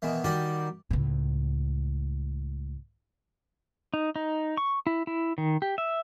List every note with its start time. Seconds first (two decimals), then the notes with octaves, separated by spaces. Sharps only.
0.02 B2 D#3 E3
0.24 D#3 G3 F#4 G4 A#4 D5
0.90 C#2 A2
3.94 D#4
4.16 D#4
4.57 C#6
4.87 E4
5.07 E4
5.38 D#3
5.62 G4
5.78 E5